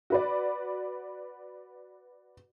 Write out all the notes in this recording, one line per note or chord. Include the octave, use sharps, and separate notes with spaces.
F#4 B4 D5